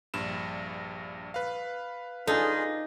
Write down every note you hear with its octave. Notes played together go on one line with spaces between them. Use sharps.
A#1 G2 E7
B4 F5
D4 D#4 F4 G#4 A4 G#5